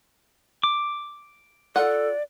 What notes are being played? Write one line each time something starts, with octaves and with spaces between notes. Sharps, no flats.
D6
F4 A4 D5 F#5